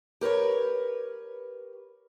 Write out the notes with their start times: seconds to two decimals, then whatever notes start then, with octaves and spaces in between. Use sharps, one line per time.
0.21 G4 A#4 B4 C#5